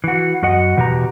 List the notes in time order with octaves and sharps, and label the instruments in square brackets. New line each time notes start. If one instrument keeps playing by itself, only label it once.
[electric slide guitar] E3 F#4
F#2 F#4 D#5 F#5
E2 B2 F#4 G4 A#5